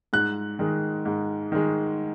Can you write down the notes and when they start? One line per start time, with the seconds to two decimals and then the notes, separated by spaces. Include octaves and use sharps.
0.13 G#2 F#6
0.59 D#3 G#3
1.05 G#2
1.52 D#3 G#3